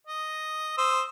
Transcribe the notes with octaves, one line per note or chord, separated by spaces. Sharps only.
D#5
C5 D#6 E6